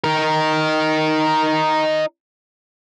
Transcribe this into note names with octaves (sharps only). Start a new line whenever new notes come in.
D#4 A#4